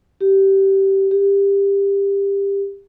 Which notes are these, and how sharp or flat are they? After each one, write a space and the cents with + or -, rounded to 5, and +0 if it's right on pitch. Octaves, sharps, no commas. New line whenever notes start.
G4 -15
G4 +20